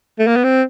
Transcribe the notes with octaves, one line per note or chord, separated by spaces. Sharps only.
A3
A#3
B3
C4